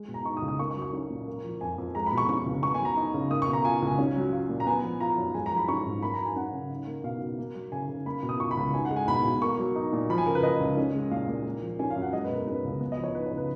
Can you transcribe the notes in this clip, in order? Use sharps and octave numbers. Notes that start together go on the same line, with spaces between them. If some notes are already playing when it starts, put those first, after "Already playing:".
Already playing: G#3
B2
A#5
D#4 C#6
D#6
C#2
D#6
A#3 C#6
C#6
F#3
C#6
C#4
A#2
A#3
F3
F2 G#5
F2
G#3 A#5
B5
B2
C#6
C#4 C#6
C#2
B3 C#6
G#5
F#3
A#5
D#4
C#3
A#3 D#6
C#6
B2
A#5
F4 G#5
C#2
G#5
C#4
F#3
F4
A#2
A#5
B3 G#5
F3
F4 A#5
F#2
G#3 G#5
A#5
F3
B5
C#4 C#6
G#2
A#3 B5
A#5
F#3
G#5
C#4 F#5
C#3
D#4
A#3
B2 F5
B2
A#3
F#3
C#3 G#5
C#3
A#3 B5
B2
D#6
F4 C#6
B5
C#2
D#4 G#5
F#5
G#3
G#5
B2 B5
B2
A#3 C#6
F#3
D#4
A#2
F3 B5
G#5
C#3 A#4
B4
A#3 D#5
C#2
C#4
G#3
A#2 F5
A#2
A#3
F3
C#4 G#5
F5
F#2
F#5
G#3 D#5
B4
B2
A#4
C#4 B4
C#2
B3
D#5
F3
C#5
D#4 B4
C#5
C#3
B4